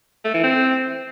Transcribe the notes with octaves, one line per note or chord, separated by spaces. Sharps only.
A3
E3
C4